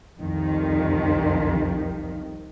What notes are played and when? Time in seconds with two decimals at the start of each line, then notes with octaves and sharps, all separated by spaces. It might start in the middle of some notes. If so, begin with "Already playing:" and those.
0.20 C2 F2 D#3